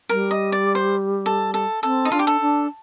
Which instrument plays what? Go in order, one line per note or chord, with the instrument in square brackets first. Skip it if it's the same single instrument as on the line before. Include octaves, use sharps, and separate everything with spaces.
[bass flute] G3 [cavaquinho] A#4
[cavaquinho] D#5
D5
C5
A4
A4
[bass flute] C4 [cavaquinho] A4
[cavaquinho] D#4
[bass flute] D4 [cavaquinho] F4
[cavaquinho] G4
A4
[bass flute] D4